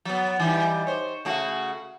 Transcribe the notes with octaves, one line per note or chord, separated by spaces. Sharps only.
F#3 B3
E3 G3 D#4
C5 C#5
C#3 A3 F#4